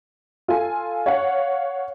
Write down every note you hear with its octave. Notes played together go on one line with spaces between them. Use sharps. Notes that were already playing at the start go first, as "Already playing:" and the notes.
F4 A4 G#5
C#5 F5 F#5